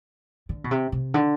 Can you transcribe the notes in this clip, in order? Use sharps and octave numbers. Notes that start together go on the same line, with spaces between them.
D3
B2
C3
C3
D3